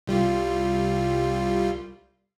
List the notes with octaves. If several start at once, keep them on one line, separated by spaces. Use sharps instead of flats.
C2 G3 F4